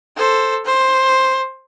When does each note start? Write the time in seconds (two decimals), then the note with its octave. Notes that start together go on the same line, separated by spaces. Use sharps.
0.17 A4 C5
0.65 C5